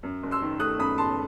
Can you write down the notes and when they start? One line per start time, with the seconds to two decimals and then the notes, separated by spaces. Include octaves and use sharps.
0.03 F#2
0.23 F#1
0.31 C6 E6
0.42 D#3
0.60 A3 D#6 F#6
0.79 F#2 B5 D#6
0.98 F#1 A5 C6